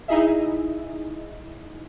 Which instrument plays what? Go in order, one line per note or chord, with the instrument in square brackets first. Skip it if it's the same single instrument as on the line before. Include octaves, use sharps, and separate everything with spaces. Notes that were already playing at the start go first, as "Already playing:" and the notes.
[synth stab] D#4 E4 G#4 D#5 E5